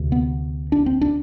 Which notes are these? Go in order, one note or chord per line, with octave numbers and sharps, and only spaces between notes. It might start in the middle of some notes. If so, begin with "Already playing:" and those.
Already playing: D2 C3
B3
D4
C4
D4